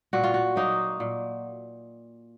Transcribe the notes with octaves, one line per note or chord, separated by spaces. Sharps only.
A#2 F#4
F4
F#4
F#3 A#3 D#4
A#2